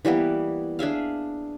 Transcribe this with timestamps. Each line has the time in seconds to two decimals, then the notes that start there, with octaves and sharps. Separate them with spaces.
0.05 E3 G3 A#3 B3
0.79 D4 G#4 E5 F5